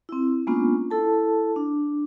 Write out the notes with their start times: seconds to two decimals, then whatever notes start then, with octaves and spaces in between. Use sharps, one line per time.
0.09 C4 E4
0.47 G#3 A#3 B3 C#4 D4 F4
0.91 E4 A4 A5
1.56 D4